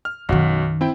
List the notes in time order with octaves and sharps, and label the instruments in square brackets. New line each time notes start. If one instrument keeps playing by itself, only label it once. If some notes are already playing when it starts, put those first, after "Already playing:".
[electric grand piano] F6
[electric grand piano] B1 F#4 [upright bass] F#2 D#3
[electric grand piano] C4 E4 G5